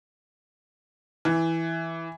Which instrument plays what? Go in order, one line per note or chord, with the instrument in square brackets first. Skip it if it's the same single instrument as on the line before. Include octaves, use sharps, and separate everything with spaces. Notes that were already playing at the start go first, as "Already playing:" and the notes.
[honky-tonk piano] E3